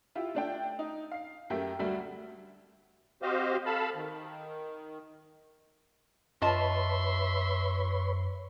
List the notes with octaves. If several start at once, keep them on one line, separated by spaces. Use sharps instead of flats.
E4 F4 G4
A3 D4 G5
D#4
F5 C7
F#2 A3 G4 A#4 G5
D2 G3 A3 F#4
C4 F#4 G4 C5 D#5 F5
A4 F5 A5 B5
D#3
F#2 F4 B4 C#5 D#5 E5 A5 C6